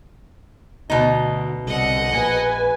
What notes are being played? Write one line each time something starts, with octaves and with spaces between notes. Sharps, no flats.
D2 B2 D#4
C2 D3 D#5 F#5
A#1 B4 G#5